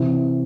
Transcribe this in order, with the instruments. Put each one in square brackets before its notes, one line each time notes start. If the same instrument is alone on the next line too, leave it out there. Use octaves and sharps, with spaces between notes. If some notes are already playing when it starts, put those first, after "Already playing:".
Already playing: [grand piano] C3 E3 C4